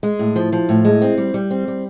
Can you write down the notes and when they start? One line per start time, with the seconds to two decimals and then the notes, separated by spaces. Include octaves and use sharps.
0.03 G#3
0.19 A2
0.36 F3
0.52 F3
0.69 A2
0.85 G#3
1.01 C4
1.18 G3
1.34 G3
1.50 C4
1.68 G3